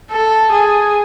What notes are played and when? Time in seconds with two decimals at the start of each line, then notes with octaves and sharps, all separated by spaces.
0.11 A4
0.51 G#4